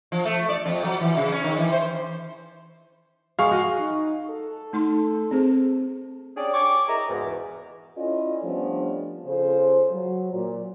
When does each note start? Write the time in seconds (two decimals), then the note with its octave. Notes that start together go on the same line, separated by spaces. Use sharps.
0.12 F3
0.25 A3
0.49 D5
0.66 F2
0.84 F#3
1.01 E3
1.17 C#3
1.32 C#4
1.44 D#3
1.57 E3
1.72 C5
3.39 G#3 G#4 F5 C#6
3.51 F#4 D#5
3.79 D#4
4.30 A4
4.73 A3 D#4 C6
5.31 C4 G#4 C5
6.37 C#4 D4 G4 G#4 D5
6.54 C#5 G5 G#5 C#6 D6
6.87 E4 G#4 D#5 E5 A#5
7.08 C#2 G#2 B2
7.23 E2
7.96 C#4 E4 F4 A4 D5 D#5
8.44 F3 G3 A3 B3 C#4 D4
9.26 C#3 F4 A4 C5
9.92 F#3
10.34 A#2